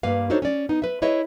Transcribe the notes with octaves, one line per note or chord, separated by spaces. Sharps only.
G2 A#3 B4 F5
D4 D#4 F#4 A4 C5 C#5
C#4 D5
B3 D#4
B4 E5
E4 G#4 B4 C#5 D#5 E5